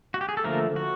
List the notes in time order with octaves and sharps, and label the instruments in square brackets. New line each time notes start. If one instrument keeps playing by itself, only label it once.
[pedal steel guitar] F#4
G4
G#4
A4
D3 F3 A3 A#3 A#4
F#4